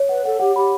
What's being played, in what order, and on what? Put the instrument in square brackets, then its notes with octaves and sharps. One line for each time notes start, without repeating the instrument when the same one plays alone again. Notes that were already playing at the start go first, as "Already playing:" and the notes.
Already playing: [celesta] C#5
[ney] B4 [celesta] F#5
[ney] A4 [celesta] F#5
[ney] G4 [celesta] F#5
[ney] G4 [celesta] B5